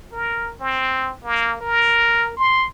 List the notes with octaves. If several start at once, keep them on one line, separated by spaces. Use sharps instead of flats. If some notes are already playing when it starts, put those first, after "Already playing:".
A#4
C4
A#3
A#4
C6